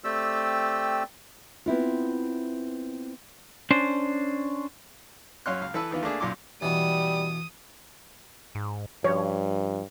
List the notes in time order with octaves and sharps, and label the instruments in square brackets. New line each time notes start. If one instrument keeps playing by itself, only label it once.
[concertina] A3 C4 G4 D5 G5 E6
[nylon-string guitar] B3 C4 E4 F4
[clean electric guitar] C#4 D4 C5
[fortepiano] F#2 C#4 C#5 F5 C6 F#6
C#2 F5
E3 A4 B4 E6
D#3 E3 B3 F4
A3 A#3 D4 G#4
B1 F#2 A#2 C6 D6
[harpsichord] B2 E3 [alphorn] G3 [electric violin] D#6
[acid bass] G#2
[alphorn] G2 [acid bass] F3 [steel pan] C#5